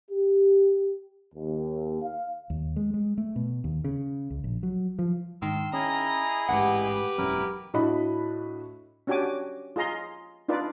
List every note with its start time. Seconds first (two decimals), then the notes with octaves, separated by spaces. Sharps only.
0.11 G4
1.34 D#2
2.03 F5
2.50 D#2
2.76 G#3
2.94 G#3
3.18 A3
3.36 B2
3.64 D#2
3.84 C#3
4.30 C#2
4.44 A#1
4.63 F#3
4.99 F3
5.42 G#2 D#3 C6 E6
5.73 C#4 E4 G#4 D#5 A#5
6.49 A1 G#2 G4 B4 F#5
7.18 E1 F#2 C#4 E4 A#4
7.74 A2 D4 F#4 D#5 B5
9.07 C#4 D4 F#4 G4 G#5 D6
9.76 F4 G#4 D#5 A#5 C6
10.48 D4 D#4 F4 B4 D5